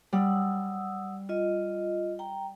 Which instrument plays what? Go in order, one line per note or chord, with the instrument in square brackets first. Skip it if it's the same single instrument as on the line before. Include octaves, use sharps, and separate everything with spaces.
[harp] G3 [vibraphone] F#5 D#6 E6
[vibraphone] F4 D#5
G5 A#5